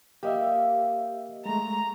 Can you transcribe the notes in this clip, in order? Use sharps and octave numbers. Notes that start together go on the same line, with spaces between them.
A#3 G4 D#5 E5
G#3 A3 A#5